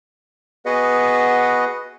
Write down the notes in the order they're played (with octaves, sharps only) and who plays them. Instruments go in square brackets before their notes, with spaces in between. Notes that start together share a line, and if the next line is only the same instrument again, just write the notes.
[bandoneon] B3 F#4 G#4 B4 D#5 F#5